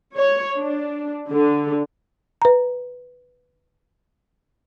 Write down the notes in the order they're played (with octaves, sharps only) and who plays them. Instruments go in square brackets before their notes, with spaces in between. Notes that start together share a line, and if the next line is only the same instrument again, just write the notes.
[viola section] C#5
D4
D3
[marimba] B4 A#5